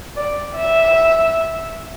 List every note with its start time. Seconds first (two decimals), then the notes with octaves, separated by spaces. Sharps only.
0.17 D5
0.55 E5